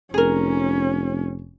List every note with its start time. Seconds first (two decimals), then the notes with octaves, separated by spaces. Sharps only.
0.14 F1 C#4 G#4 A#4